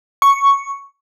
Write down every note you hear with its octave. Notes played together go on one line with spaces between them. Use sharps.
C#6